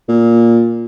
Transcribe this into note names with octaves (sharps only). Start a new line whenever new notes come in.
A#2